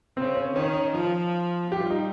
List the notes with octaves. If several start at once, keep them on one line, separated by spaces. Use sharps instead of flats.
C#3 C4
C#4
D#3 C#4
D#4
F3 F4
G3 G4
F4
D#4